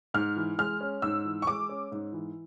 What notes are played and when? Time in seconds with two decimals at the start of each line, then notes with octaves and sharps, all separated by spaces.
0.14 G#2 F6
0.36 E3
0.58 G#3 F6
0.81 C#4
1.02 G#2 E6
1.25 E3
1.42 C#6
1.47 G#3 D6
1.69 C#4
1.92 G#2
2.13 E3